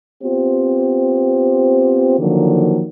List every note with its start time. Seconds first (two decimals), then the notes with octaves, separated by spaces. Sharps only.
0.24 B3 C4 F4 G4 C5
2.19 D3 D#3 F3 F#3 A#3